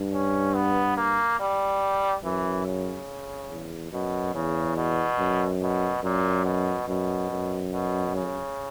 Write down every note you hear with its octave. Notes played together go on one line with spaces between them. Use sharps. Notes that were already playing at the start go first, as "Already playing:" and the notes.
Already playing: G2
C#4
B3
A#3
G3
F#2 E3
C#3
E2
F#2 B2
E2 C#3
B2
F#2
B2
F#2 A#2
B2
F#2 B2
F#2
B2
C#3